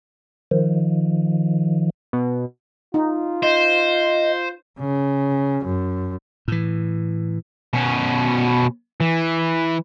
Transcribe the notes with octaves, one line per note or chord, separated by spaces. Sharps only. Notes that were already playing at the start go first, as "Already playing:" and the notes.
D#3 F3
B2
D#4 F4
C5 D#5
C#3
F#2
A2 E3
B2 C#4
E3